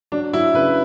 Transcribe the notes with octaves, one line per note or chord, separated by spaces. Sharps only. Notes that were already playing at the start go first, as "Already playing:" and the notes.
F#3 D4
F#3 E4
C#3 B4